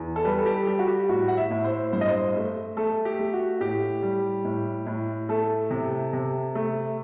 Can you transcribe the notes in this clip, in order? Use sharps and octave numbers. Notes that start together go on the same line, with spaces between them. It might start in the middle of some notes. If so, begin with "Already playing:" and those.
Already playing: E2
A4
G3 B4
A4
G4
G3 G4
F#4
G4
A2 F#4
F#5
E5
A2
C5
G2 C5
D#5
C5
A3
A3 A4
G4
A3
F#4
A2 G4
G3
A2
A2
A3 A4
C3
C3
A3